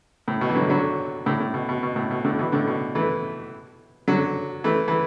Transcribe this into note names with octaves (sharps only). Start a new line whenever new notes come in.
A2
B2
E3
D3 F#3
D3 F#3
A2 D3
A2
B2
B2
B2
A2
B2
A2 D3
B2 E3
A2 D3
B2
E3 A3
D3 F#3
E3 A3
E3